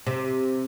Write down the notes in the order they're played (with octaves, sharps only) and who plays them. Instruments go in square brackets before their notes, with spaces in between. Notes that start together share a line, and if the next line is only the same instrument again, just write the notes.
[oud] C3